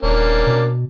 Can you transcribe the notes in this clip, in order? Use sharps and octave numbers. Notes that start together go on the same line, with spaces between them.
D#1 A#3 C#4 D4
B2